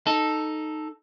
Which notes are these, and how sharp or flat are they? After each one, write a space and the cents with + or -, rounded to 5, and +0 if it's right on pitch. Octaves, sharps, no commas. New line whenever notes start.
D#4 -5 A4 +0